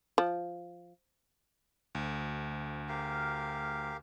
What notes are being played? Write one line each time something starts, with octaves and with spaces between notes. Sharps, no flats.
F3
D2
G4 A#4 F5